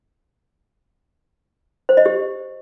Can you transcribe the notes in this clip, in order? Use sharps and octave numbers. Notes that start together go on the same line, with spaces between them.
C5
D#5
G4